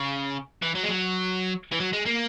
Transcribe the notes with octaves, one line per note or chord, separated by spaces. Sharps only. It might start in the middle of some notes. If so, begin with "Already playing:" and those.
Already playing: C#3
E3
F#3
G#3
F#3
E3
F#3
G#3
A#3